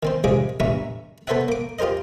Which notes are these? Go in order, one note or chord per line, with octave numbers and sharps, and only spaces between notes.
D#3 C4 C5
G2 C3 F3 G#3 G#4 D6
A#1 G2 E3 D#4 E5 C#6
B3 A4 C5 C#5 E5 F#5
A#3 D6
F4 G4 A#4 C5 D#5